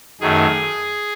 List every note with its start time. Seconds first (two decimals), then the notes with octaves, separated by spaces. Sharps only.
0.21 F#2 D#3 A3 G#4